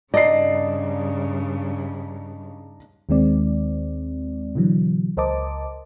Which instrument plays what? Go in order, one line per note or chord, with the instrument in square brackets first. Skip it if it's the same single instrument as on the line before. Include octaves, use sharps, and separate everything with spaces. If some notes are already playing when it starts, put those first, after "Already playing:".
[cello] G2 C#3 [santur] D4 D#4 A5 [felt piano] D5 C7 [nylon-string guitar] D#5
[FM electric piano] D#2 D#3 G#3 C4 D5
B2 D3 E3 F#3
C#2 A#4 C5 D#5 A5 D6